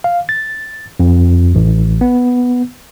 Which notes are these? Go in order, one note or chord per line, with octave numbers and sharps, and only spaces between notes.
F5
A6
F2
A1
B3